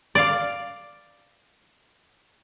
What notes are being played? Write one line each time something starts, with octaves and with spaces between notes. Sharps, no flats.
D5 F5